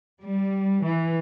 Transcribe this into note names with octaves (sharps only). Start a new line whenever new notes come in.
G3
E3